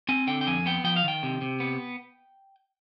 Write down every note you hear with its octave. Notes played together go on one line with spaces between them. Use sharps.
C4 G#5
D3 G5
G5
F2 G#5
B3 G5
F3 G5
F5
D#3 G5
C3
C3
B3